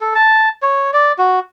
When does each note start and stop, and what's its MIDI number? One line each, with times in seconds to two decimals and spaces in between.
0.01 0.14 69
0.15 0.49 81
0.62 0.91 73
0.93 1.12 74
1.18 1.39 66